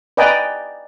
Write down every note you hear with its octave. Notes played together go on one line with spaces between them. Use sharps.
B4 D5 D#5 G5 G#5 A#5